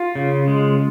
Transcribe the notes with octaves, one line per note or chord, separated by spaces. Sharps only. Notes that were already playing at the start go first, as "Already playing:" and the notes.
Already playing: F4
C#3
G#3